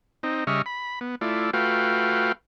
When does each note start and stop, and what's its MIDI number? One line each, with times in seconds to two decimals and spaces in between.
0.23 0.44 60
0.23 0.44 63
0.47 0.62 49
0.47 0.62 55
0.47 0.62 75
0.47 0.62 76
0.47 0.62 85
0.47 0.62 89
0.66 0.99 83
1.01 1.15 59
1.21 1.51 57
1.21 1.51 64
1.21 1.51 65
1.21 1.51 74
1.53 2.32 57
1.53 2.32 65
1.53 2.32 66
1.53 2.32 71
1.53 2.32 77
1.53 2.32 79